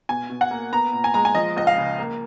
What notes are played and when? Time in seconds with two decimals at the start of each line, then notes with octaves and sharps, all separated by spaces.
0.09 B2 G#5
0.30 B2
0.41 F#5
0.51 A#3
0.73 B3 A#5
0.93 A#2
1.04 G#5
1.14 G#3 A#5
1.25 G#5
1.35 F3 D#5
1.57 C#2 D#5
1.67 F5
1.77 C#3
1.99 A#3